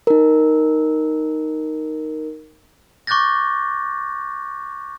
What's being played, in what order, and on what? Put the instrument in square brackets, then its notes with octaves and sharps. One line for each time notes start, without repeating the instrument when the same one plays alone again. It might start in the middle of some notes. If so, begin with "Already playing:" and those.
[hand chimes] D#4 A#4
[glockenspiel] C#6 D6 F#6 G6 A6 A#6